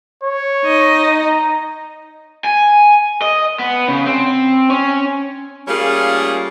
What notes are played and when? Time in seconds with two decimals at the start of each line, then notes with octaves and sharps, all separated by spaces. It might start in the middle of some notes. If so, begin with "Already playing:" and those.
0.23 C#5
0.65 D#4 D#5
1.06 A#5
2.44 G#5
3.22 D#5
3.59 B3
3.88 C#3
4.07 C4
4.70 C#4
5.68 G3 A3 A#3 C#4 F4 G#4